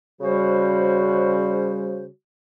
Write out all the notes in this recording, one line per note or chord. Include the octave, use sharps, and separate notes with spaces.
C#3 G3 F#4 C5